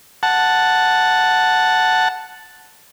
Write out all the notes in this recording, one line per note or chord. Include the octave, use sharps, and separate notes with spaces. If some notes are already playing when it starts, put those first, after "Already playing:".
F#5 A5